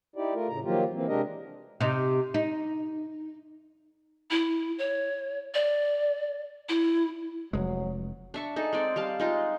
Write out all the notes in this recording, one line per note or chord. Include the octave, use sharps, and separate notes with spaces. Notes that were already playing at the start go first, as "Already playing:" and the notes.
D#4 E4 G4 D5
A3 F4 A#4
A2 C#3 A#5
D#3 F3 F#3 A#3 F4 G4
E3 A#3 C4
C3 G#3 D4 G4 A#4 D#5
C3 D#4
D#4
E4
C#5
D5
E4
F1 F#3 G#3
D4 E5 C#6
D#4 G#4 A4
G#3 C4 D5
G3 F5 A5
G#3 D#4 F4